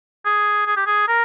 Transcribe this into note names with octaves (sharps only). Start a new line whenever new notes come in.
G#4
G#4
G4
G#4
A#4